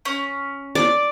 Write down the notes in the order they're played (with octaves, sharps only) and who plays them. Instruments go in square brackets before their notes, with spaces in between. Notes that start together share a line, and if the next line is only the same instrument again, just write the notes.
[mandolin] C#4
[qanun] D5